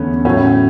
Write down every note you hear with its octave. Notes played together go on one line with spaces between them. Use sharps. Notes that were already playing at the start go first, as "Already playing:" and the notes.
Already playing: E2 D3 A3 B3 C#4
A2 F#3 A3 C#4